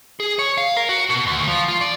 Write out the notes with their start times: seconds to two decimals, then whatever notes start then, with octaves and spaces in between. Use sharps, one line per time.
0.20 G#4
0.39 C#5
0.57 F5
0.77 A#4
0.89 F#4
1.09 B2
1.27 D2
1.48 F3
1.68 F4
1.81 D5